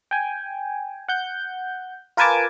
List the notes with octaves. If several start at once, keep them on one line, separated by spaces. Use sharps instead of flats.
G5 G#5
F#5 G6
F4 A#4 B4 G#5 A5 D6